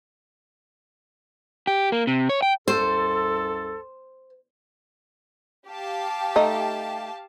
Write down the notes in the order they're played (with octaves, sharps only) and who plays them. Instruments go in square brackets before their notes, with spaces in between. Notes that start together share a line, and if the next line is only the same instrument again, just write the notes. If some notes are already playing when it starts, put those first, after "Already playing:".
[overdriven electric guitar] G4
A#3
C3
C#5
G5
[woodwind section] C2 F#2 A4 [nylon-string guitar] C5
[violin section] G4 F5 A5
[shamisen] A3 D#4